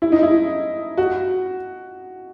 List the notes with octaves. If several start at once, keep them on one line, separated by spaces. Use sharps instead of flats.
E4
D#4
E4
F#4